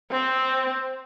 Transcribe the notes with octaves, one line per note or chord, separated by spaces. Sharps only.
C4